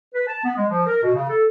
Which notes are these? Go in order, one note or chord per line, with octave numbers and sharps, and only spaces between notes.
B4
A5
B3
G#3
F3
A#4
B2
C#3
A4